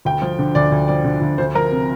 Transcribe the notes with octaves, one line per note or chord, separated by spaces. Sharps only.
D2 G5
F3
D3
D2 D5
D2
F3 D5
D3
D2
D2 C5
F3 A#4
C3